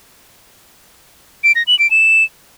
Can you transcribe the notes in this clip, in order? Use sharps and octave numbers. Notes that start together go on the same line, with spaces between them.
D7
A#6
F#7
D7
E7